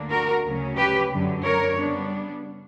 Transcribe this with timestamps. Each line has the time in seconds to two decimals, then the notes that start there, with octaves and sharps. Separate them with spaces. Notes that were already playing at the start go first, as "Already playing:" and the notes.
Already playing: D2 D3 A#3 D4
0.10 F#4 A#4
0.44 D2 C#3 F#3 C#4
0.76 G4 B4
1.11 F#2 D3 F#3
1.43 A#4 C#5
1.77 C#3 G3 B3 D4